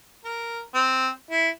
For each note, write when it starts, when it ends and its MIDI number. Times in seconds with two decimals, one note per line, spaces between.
0.25 0.60 70
0.75 1.09 60
1.30 1.49 64